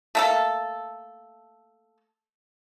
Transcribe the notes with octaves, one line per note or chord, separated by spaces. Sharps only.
A3 A#3 A4